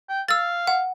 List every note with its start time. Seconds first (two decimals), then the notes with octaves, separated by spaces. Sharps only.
0.09 G5
0.28 F5 E6 A6
0.67 F#5